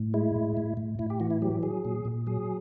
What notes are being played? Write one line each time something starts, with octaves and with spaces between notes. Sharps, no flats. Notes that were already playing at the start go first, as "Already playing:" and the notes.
Already playing: A2
G#3 E4
A2
A2
A2
A2 E4
G4
E3 F#4
E4
F#3 G4
F#3 G#4
A#2
A#2
F#3 G#4